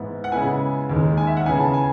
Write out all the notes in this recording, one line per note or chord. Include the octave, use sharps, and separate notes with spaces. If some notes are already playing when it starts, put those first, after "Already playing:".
Already playing: G#2 E3 B3 E4
F#5
C#3 G#3 B3 E4 G#5
D#2 D#3 G#3
G#5
E5
F#5
C#3 E3 B3 G#5
A5
G#5